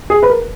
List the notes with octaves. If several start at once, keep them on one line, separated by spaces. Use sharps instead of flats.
G#4
B4
A#4